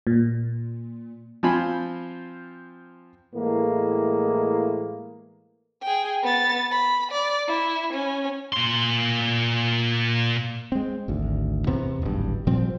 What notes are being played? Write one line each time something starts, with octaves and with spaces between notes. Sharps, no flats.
A#2
F3 C4 F4 G#5 B5
A2 E3 G#3 A#3
G#4 G5
B3 A6
B5
D5
E4
C#4
A#2 C6
G#3 C4
G#1 D2
E2 C3 B3
D1 G#1 G2
A#2 F3 G3 C4